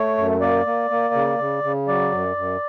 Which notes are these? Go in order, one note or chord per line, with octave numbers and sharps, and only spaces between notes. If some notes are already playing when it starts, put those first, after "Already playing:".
Already playing: A3 C#5
F#2
A#3 D5
A#3
A#3
C#3
C#3
C#3
F#3 D5
F#2
F#2